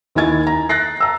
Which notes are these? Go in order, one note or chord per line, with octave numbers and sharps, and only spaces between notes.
D#2 D#4 E4 G#5 G#6 A6
A#5
F#6 A6 A#6 C7
A5 A#5 E6